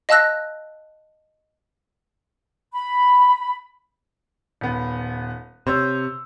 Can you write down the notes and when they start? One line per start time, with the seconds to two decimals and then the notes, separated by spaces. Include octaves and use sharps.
0.09 D#5 F5 A5 E6 F#6 A#6
2.73 B5
4.61 D#1 B3
5.67 C3 C5 C#5 E6